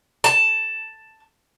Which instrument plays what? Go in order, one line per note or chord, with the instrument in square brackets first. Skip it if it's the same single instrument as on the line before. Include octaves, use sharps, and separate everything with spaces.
[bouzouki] A5